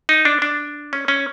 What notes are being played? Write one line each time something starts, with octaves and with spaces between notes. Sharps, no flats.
D#4
D4
D4
C#4
C#4